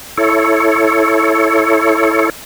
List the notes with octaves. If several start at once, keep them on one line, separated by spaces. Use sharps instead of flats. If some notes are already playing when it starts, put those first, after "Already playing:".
E4 A4 C#5